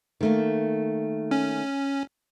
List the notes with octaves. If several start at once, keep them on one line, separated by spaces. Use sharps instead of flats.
D#3 A3 A#3
C#4